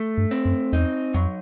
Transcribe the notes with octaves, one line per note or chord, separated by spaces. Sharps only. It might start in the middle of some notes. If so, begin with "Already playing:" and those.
Already playing: A3
G2
C4
F#2
E2 D#4
F2 F#3